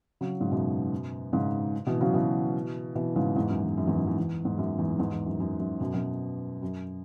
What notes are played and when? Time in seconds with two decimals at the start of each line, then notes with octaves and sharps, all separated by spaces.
0.21 C#3 F#3
0.41 G#2 C#3
0.51 F#2 B2
1.33 G#2 C#3
1.87 B2 E3
2.01 C#3 F#3
2.14 B2 E3
2.95 B2 E3
3.16 G#2 C#3
3.36 E2 G#2
3.49 F#2
3.63 E2
3.77 F#2
3.87 E2 G#2
3.97 F#2
4.07 E2
4.18 E2
4.45 E2 G#2
4.58 F#2
4.78 E2 G#2
4.99 E2 G#2
5.12 E2
5.26 F#2
5.40 F#2
5.60 F#2
5.80 F#2 B2
5.94 F#2 B2
6.62 F#2